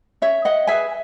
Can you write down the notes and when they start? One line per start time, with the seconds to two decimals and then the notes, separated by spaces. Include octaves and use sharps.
0.22 C#4 C#5 E5
0.45 D#5 F#5
0.67 G#4 B4 E5 G#5